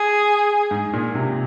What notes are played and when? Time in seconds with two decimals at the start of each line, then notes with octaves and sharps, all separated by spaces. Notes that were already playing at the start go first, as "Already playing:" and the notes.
Already playing: G#4
0.71 G#2
0.93 A#2
1.14 C3